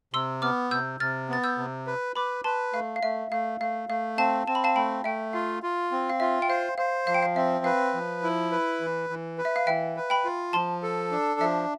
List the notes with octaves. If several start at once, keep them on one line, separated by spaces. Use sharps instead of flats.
C3 C6 E6
B3 D6 F6
C3 E6 G6
C3 F6 A6
B3 A6
E6 G6
C3
B4
B4 B5 D6
B4 A5 C6
A3 F5
F5
A3 E5
A3 F5
A3 F5
A3 F5
C4 F5 A5
C4 A5
B5
F5 A5
A3 G5 B5
A3 E5 G5
F4 F5
F4
C4
F5
F4 E5
G5
C5 F5
C5 F5
F3 F5
G5
F5
C4 E5
B4 F5
F3
E4
B4
E3
E3
B4
E5
F5
E3 E5 G5
B4
G5 B5
F4
F3 A5 C6
A4
D4
F3 E5